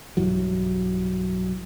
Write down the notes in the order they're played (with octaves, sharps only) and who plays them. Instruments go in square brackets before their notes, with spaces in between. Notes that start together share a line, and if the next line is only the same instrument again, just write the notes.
[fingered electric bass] B1 G2 E3 F#3